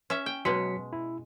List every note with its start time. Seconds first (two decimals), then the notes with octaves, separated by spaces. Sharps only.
0.10 C#4 E5
0.26 G5
0.45 B2 F#3 G#3 B6 C#7
0.93 E4